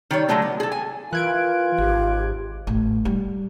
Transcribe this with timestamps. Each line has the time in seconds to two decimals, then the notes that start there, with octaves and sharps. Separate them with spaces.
0.11 D#3 G3 C#5
0.29 D3 F#3 G#3 A3 C4
0.42 B3
0.60 G#4 A4
0.72 G#5
1.13 E3 F4 A#4 F#6 G#6 D7
1.78 G#1 G4
2.67 A1
3.05 G3